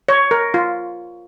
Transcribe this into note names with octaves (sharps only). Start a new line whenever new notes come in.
C#5
A#4
F4